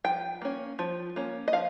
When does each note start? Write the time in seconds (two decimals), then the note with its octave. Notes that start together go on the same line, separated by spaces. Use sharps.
0.04 F3 G5
0.42 A#3 C#4
0.79 F3
1.16 A#3 C#4
1.48 D#5
1.53 F3 F5